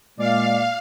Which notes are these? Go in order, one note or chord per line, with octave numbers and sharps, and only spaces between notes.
A#2 G#3 D5 F5